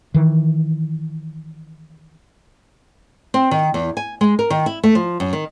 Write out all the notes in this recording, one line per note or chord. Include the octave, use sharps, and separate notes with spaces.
D#3 E3
C4
D#3
E2
G#5
G#3
A#4
D#3
E4
A3
F3
F#2
D#3